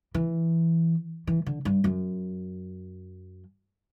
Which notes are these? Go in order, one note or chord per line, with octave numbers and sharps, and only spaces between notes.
E3
E3
D3
G2
F#2